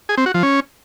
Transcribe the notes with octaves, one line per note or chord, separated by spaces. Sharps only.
G#4
C4
F#4
F3
C#4